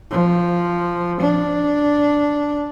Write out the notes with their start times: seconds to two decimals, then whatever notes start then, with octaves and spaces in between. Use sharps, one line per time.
0.11 F3
1.21 D4